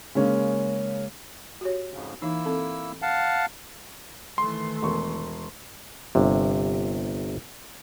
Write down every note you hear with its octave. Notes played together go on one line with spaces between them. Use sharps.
C#3 G#3 A#3 C#4
F#4 G4 C#5
F2 G#2 C#3
E3 A#3 D#4 E4 E6
C4 A4
F5 F#5 A5
D#3 E3 A3 C6
E1 C#6
G1 C3